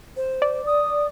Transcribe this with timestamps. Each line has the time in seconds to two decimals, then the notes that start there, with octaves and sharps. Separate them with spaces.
0.17 C5
0.42 D5
0.66 D#6